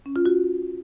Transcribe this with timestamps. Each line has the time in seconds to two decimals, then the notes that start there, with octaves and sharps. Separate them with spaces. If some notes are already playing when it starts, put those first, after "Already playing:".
0.06 C#4
0.16 F4
0.25 F#4